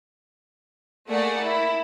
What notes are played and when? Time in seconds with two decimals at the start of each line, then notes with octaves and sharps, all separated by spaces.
1.07 A3 A#3 G#4 D5 F#5
1.41 E4